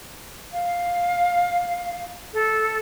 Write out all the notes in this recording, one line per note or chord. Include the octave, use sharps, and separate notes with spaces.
F5
A4